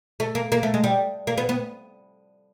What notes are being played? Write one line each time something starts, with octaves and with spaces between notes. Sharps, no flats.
A3
A#3
A#3
A3
G#3
G3
A#3
B3
B3